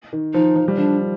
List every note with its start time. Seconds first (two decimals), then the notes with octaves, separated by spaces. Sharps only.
0.13 D#3
0.34 F3 D#4
0.56 F3
0.68 G3
0.77 F3 D4